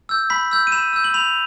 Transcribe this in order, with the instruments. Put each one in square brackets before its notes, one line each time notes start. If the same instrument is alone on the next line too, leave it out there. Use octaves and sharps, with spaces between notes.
[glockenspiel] E6 G6
B5 B6
E6 G6
D#7
B5 E7
E6 G6
F#7
B5 F7